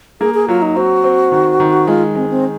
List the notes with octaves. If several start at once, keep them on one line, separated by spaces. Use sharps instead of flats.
A#3 G#4
G#4
F#3 F4
D#4
C4 F#4
C4
D#3
D#3
G#3 F4
G#3 C4
C4